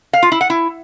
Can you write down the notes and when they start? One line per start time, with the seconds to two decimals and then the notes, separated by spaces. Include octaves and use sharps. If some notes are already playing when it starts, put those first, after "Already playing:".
0.13 F5
0.23 F4
0.32 E4
0.41 F#5
0.50 E4